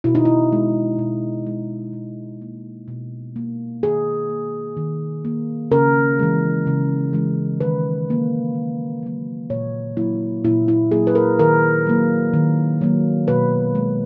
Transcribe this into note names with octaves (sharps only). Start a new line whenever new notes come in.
B2 E4
D#4
E4
G#3
B2
G#3
B2
A#3
B2
A#3
D#3 G#4
A#3
D#3
A#3
C#3 A#4
E3 G#3
C#3
E3 G#3
D#3 B4
F#3 A#3
D#3
F#3 A#3
A#2 C#5
F#3 A#3 E4
A#2 E4
E4
F#3 A#3 G#4
B4
A#4
D#3 A#4
F#3 A#3
D#3
F#3 A#3
B2 B4
G#3